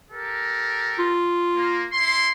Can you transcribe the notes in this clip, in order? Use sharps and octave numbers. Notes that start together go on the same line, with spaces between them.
G4 A4 A#4
F4
A#3
E4 C6